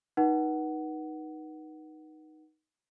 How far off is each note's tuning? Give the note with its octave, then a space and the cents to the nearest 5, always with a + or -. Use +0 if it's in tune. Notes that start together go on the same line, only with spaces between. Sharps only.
D#4 +0 B4 -35 F#5 +15